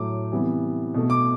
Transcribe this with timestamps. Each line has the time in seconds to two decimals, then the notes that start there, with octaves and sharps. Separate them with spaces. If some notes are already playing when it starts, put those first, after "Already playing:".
Already playing: A2 F#3 A3 D6
0.32 C3 E3 G3 B3
0.94 B2 A3
1.10 D6